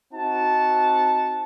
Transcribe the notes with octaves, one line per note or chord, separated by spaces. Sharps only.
C4 D#4 F#4 F#5 A5